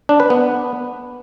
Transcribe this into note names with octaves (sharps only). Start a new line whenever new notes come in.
D4
B4
B3